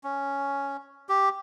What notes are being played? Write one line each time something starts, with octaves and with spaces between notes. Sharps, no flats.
C#4
G4